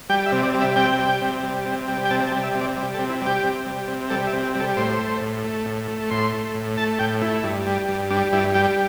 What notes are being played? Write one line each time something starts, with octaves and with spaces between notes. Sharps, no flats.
G3 G5
E5
C3
D5
G3
E5
C3 G5
G3
C3
G3
C3
G3
G5
C3 A5
A5
G3
E5
C3
D5
G3
A4
C3
E4
G3
G4
C3
G3
C3
G3 A4
E5
C3
G4
G3 A4
A2 C5
A3
A2
A3
A2
A3
A2 C6
A3
A2
A3 A5
A2 G5
A3 E4
G2
G3
G2
G3 D4
G2 E4
G3 G5